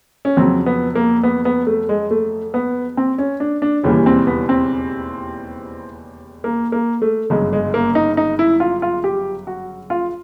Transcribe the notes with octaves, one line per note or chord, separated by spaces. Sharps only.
C#4
F2 C#3 F#3 C4
B3
A#3
B3
B3
A3
G#3
A3
B3
C4
C#4
D4
D4
E1 D#2 C#3 E3 G3 C#4
C4
B3
C4
A#3
A#3
A3
G1 F#2 C#3 G#3
G#3
A#3
D#4
D#4
E4
F4
F4
G4
F#4
F4